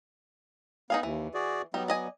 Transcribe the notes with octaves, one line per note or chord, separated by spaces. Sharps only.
B3 D#4 G#4 F5
D#2 E3
F#4 G#4 D5
F#3 G3 B3 D#4
D5 D#5 G#5